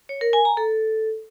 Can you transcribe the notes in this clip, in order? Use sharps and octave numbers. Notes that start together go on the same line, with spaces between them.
C#5
A#4
G#5
A#5
A4